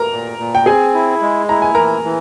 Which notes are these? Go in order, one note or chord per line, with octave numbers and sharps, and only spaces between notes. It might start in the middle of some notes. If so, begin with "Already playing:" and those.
Already playing: A#4 A#5
A#2
A#2
G5
C4 G#4 G#5
E4
G#3
E4 A#5
G#5
E3 A#4 A#5
E3